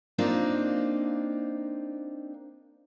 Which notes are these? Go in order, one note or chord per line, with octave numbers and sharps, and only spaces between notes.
A#3 C4 D4 D#4 F4